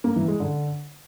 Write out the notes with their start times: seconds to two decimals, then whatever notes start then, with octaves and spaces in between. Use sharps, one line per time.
0.04 A#3
0.16 E3
0.28 G#3
0.40 D3